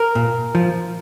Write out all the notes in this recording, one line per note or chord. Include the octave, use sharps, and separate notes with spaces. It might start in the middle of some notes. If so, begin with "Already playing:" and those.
Already playing: A#4
A#2
F3